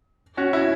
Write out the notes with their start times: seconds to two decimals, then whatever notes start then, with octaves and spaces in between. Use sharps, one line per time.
0.37 C#4 F#4
0.53 E4